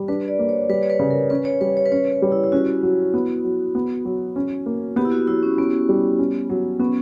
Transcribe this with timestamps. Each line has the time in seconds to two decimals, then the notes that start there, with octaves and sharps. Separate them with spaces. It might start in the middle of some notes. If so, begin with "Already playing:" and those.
Already playing: G3
0.08 D4 B4
0.28 D5
0.39 A#3
0.49 C#5
0.69 G3 B4
0.83 C#5
0.90 B4
0.99 C#3
1.11 A#4
1.30 C#4 B4
1.45 C#5
1.61 G3 B4
1.77 C#5
1.86 B4
1.91 C#4 C#5
2.12 B4
2.22 G3
2.32 E4
2.44 E4
2.52 C#4 F#4
2.83 F#3
3.14 B3
3.44 F#3
3.75 B3
4.05 F#3
4.36 C#4
4.66 A#3
4.96 B3 G4
5.05 E4
5.12 F#4
5.27 F#3 E4
5.43 C#4
5.58 B3 C#4
5.89 G3
6.19 C#4
6.50 F#3
6.79 B3 C#4